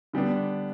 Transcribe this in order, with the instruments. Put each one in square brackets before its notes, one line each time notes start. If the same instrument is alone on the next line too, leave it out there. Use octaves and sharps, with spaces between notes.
[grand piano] D3 G3 B3 D4